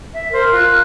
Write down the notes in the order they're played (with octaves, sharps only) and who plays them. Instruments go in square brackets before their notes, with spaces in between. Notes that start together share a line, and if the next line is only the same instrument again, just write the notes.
[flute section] E5
[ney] A#4 [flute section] C5
[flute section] F4 F#6